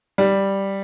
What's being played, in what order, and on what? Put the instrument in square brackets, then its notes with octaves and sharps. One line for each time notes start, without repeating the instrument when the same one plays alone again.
[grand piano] G3